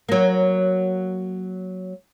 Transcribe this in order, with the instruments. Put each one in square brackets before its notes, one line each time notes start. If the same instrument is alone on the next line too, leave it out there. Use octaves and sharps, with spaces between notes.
[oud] F#3 A#3